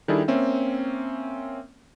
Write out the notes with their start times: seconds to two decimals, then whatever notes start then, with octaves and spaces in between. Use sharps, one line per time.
0.08 D#3 G3 D4 E4 G#4 A4
0.28 A#3 C4 C#4 E5